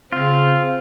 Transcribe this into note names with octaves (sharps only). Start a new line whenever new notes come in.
C#3 C4 F4